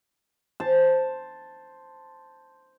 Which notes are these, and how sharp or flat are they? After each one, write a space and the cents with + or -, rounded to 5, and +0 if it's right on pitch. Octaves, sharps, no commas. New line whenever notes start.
C5 +0 A5 +0